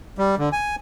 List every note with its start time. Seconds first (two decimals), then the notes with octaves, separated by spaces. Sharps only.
0.18 G3
0.39 D3
0.52 G#5